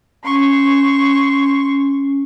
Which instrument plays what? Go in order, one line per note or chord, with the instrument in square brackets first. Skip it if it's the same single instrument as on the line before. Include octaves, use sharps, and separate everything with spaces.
[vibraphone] C#4 [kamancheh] C6 C#6